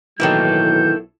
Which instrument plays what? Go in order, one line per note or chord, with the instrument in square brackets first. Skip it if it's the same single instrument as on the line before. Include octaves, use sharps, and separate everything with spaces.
[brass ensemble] B1 F#3 [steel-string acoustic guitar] D#3 E3 A#3 [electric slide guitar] E4 A4 [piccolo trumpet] G6